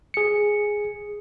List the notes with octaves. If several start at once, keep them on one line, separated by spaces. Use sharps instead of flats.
G#4 C#7